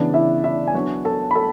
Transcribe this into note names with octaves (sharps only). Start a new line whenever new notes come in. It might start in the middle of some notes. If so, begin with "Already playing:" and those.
Already playing: C#3 E3 B3 D4 D5
E4 E5
E4 E5
G#5
F#3 B3 D4 F#4 F#5
A4 A5
B5
A4 A5